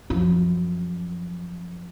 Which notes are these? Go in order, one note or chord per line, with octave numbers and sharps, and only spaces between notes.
F#2 F3